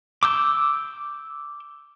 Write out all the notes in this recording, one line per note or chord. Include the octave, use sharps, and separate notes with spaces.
D6 E6 G6